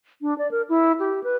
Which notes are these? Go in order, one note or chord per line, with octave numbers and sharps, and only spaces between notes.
D4
D5
A#4
E4
G4
B4